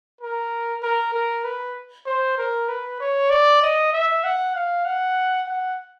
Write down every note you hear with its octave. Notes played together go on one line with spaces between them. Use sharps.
A#4
A#4
A#4
B4
C5
A#4
B4
C#5
D5
D#5
E5
F#5
F5
F#5
F#5